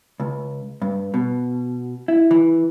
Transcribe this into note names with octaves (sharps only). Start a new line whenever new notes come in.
C#2
G2
B2
E4
E3